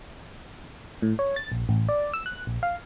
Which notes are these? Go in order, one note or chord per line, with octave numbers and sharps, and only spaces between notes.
A2
C#5
A6
A#1
A1
D5
E6
F#6
A#1
F5